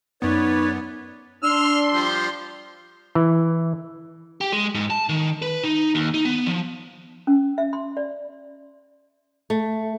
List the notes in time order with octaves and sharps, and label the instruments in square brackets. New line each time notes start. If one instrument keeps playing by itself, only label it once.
[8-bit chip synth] F#2 B3 [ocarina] D#4 [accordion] B4 C#5 D5
[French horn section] D4 [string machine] C6 [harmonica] E6 F6
[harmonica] F3 G3
[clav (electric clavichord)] E3
[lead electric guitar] G4
G#3
G#2
A5
D#3
B4
D#4
D#2
D#4
B3
F3
[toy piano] C#4
E5
C6
D5
[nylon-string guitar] A3